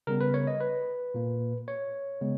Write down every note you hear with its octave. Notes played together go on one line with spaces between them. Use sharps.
C#3 G3 B3 A#4
B4
C#5
D#5
B4
A#2 A#3
C#5
C#3 G#3 B3